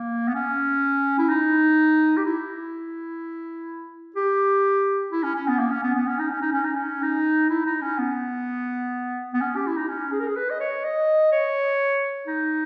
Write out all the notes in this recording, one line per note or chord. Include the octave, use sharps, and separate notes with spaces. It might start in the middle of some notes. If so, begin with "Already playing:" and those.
Already playing: A#3
B3
C#4
E4
D#4
G4
E4
G4
E4
C#4
C#4
B3
A#3
C#4
B3
B3
C#4
D#4
C#4
D#4
C#4
D#4
C#4
D#4
E4
D#4
C#4
B3
B3
C#4
G4
E4
D#4
C#4
G#4
A#4
G#4
B4
D#5
C#5
D#5
C#5
D#4